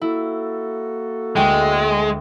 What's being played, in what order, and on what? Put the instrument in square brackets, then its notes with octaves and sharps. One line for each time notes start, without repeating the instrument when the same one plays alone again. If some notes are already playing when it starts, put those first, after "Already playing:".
[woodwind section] A#3 F#4 A4 [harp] E4
[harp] D2 G5 D7 [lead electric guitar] G#3